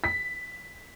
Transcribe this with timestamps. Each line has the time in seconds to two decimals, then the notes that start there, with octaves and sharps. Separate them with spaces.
0.04 B6